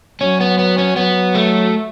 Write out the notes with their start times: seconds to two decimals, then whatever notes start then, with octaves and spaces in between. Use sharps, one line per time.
0.21 F#3 C#4
0.40 B3
0.59 B3
0.78 C#4
0.96 F#3 B3
1.35 A3